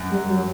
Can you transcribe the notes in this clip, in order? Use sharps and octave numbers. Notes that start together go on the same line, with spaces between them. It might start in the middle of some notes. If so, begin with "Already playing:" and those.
Already playing: F#2
G3
F#3